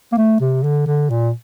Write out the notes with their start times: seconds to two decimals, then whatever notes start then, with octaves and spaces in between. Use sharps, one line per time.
0.12 A#3
0.18 A3
0.40 C3
0.63 D3
0.87 D3
1.10 A#2